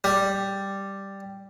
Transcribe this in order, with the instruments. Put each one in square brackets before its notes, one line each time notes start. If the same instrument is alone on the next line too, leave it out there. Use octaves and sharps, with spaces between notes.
[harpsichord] G3